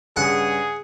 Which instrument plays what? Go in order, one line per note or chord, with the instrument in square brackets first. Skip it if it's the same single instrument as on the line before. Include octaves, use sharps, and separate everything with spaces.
[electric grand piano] G2 C#3 [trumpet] G#4 [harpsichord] F#5